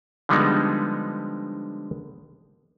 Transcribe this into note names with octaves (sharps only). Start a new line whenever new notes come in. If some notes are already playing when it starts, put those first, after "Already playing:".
D3 F3 G3 G#3 B3 D#4